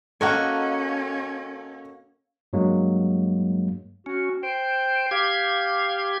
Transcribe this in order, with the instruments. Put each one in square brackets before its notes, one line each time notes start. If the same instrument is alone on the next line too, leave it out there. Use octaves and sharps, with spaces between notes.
[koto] A#3 F#4 G#5 [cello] C#4 [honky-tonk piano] A4 D#5 F#5
[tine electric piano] G2 F#3 G#3 A#3
[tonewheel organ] C#4 [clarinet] F#4
[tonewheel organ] C5 [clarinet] G5
[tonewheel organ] G4 G#6 [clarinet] F5